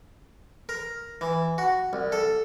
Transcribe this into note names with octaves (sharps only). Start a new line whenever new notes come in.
A#4
E3
F#4
C2
A4